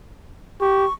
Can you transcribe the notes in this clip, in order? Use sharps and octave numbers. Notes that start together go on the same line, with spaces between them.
G4 C#6